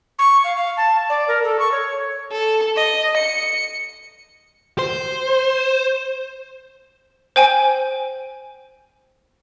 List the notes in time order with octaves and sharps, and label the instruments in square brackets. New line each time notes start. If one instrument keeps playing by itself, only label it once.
[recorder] C#6
F5
F5
A5
D5
A#4
A4
C#6
C#5
[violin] A4
D#5
C#7
[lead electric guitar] C5
[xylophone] C5 G5 G#5